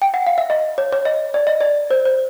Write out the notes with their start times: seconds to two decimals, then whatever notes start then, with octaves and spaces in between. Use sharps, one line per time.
0.02 G5
0.14 F#5
0.27 F5
0.38 E5
0.50 D#5
0.78 C#5
0.93 C#5
1.05 D#5
1.34 D5
1.47 D#5
1.61 D5
1.91 C5
2.05 C5